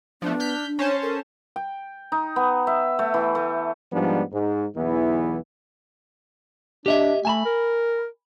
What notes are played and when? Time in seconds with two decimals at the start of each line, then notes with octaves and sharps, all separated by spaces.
0.22 F3 A3 B3 D4
0.40 F6 G6 B6
0.65 D4
0.79 C#4 C5 C#5 A5
1.03 A4 A#4
1.56 G5
2.12 D#4
2.36 B3
2.67 E5
2.99 A3
3.14 E3
3.35 A3
3.92 G#2 F3 G3 B3 D4
4.32 G#2
4.76 B1 E2 E3 B3 E4
6.86 D4 G4 D#5 E5
7.25 A3 G#5 A5 B5
7.45 A#4